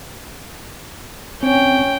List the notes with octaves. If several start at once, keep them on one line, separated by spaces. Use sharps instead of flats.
C4 C#4 G5